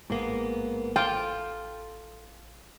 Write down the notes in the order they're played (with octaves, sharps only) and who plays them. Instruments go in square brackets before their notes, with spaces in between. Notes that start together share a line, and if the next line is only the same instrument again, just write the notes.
[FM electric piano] A1 [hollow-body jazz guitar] G#2 A#3 B3
[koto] F4 [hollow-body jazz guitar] A4 [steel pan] G5